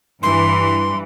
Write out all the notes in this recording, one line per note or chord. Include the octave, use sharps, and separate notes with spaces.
G2 E3 C6